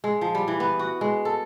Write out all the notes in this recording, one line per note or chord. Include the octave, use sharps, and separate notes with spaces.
G#3
F3
G3
E3
B3
F#4
G#3
A4